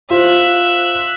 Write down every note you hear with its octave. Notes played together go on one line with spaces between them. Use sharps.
F4 C5 E5 F#6